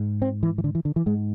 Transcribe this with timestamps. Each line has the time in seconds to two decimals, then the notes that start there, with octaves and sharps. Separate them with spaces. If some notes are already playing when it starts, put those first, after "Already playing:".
Already playing: G#2
0.22 C4
0.43 E3
0.58 E3
0.64 D3
0.75 E3
0.85 D3
0.96 E3
1.06 G#2 G#3